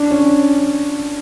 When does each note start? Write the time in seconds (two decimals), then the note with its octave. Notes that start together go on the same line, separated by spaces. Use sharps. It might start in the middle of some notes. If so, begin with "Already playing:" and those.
Already playing: D4
0.11 C#4